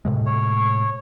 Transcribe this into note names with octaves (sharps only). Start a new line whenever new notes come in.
A2 C3 G#3
C#5